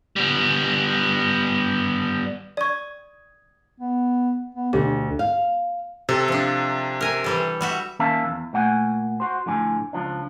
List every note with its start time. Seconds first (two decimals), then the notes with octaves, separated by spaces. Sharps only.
0.16 G3 B3
2.57 D5 C#6 D#6 G#6
3.80 B3
4.55 B3
4.73 D2 B2 G4
5.19 F5
6.09 C3 A4
6.28 F3 D4
7.01 A#4 G#5
7.24 E3 G3 A4
7.61 G3 F#4 E5
7.99 D#3 A#3 C#4 E5 F5 A5
8.25 E2
8.53 A#2 A3 F#5 G#5
9.20 F#4 C5
9.46 F2 A2 D3 G#5
9.93 C#2 F3 D4